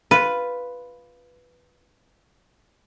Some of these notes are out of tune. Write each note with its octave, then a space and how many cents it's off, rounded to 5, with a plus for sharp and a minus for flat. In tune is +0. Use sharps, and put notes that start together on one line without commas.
F4 +0 B4 +0